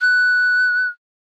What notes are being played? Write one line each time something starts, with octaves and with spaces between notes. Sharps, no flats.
F#6